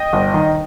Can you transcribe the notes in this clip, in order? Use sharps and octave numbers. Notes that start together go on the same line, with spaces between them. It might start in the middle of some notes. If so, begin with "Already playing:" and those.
Already playing: D#5 G5
G1
D#3